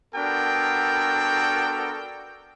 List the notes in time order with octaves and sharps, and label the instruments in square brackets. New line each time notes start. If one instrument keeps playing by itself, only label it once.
[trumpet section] B3 D4 F#4 A4 A#4 G5